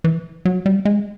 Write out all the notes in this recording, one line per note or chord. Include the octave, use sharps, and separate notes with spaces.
E3
F#3
G3
G#3